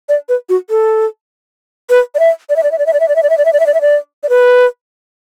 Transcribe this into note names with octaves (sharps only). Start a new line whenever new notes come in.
D5
B4
F#4
A4
B4
D5
E5
D5
E5
D5
E5
D5
E5
D5
E5
D5
E5
D5
E5
D5
E5
D5
E5
D5
E5
D5
D5
B4